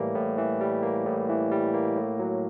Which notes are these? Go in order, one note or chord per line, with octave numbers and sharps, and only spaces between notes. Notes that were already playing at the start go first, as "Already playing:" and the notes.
Already playing: A2 E3 G3 A#3
A2
E3
G3
A#3
A2
E3
G3
A#3
A2
F#3